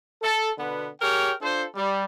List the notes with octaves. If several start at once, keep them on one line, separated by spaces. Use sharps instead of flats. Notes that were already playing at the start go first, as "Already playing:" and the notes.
A4
B2 D3 B3 B4
G4 G#4 A#4 C#5 G5
D4 F4 A4 C5
G3